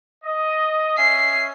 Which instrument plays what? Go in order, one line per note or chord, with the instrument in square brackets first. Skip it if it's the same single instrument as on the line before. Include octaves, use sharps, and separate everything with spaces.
[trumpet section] D#5
[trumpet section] C#4 E5 G#5 [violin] C7